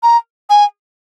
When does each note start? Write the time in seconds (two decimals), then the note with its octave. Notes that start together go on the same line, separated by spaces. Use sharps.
0.03 A#5
0.50 G#5